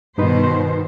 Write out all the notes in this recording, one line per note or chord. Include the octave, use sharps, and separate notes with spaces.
G2 B2 D#3 D#4 B4 C5